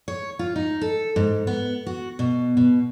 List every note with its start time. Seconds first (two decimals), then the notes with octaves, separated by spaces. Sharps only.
0.08 C#5
0.39 F4
0.56 D#4
0.81 A4
1.16 G#2
1.47 B3
1.87 F#4
2.19 B2
2.57 B2